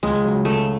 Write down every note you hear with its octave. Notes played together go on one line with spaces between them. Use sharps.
C#2 G#3
C#3 F#3
C#2 A3